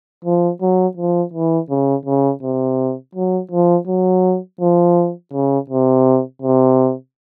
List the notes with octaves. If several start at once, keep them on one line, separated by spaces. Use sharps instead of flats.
F3
F#3
F3
E3
C#3
C#3
C3
F#3
F3
F#3
F3
C#3
C3
C3